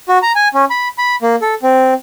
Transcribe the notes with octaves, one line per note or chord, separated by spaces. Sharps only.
F#4
A#5
G#5
C#4
B5
B5
A#3
A4
C4